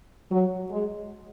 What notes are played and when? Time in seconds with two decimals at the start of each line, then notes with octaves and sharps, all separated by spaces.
0.31 F#3
0.71 G#3